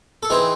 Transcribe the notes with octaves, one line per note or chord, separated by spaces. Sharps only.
A4
E3 C4 D#4 G#4